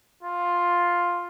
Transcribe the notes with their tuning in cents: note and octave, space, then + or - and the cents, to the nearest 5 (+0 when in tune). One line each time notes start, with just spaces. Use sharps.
F4 +5